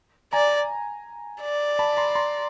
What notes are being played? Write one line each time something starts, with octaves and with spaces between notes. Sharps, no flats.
D5 G#5 A#5
D5
A5 B5
A#5 C6
A#5 C6